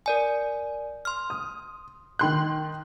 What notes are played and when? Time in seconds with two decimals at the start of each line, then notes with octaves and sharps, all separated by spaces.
0.06 A#4 D5 G#5
1.05 C6 F6
1.30 D#6
2.19 D#3 C6 F#6